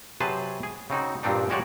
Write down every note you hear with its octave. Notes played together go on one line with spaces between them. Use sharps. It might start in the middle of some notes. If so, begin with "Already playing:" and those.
C3 F#3 G#4 B4 C5 A5
G#4
C#3 C4 D#4 F#4
G2 A#2 F3 C4 D4 D#4
F3 G#3 F#4 G4 C#5 D5